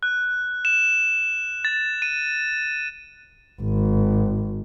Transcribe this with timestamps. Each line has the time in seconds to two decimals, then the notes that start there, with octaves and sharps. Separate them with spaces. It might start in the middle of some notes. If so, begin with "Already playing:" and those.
0.03 F#6
0.65 E7
1.65 A6
2.02 D#7
3.62 G#1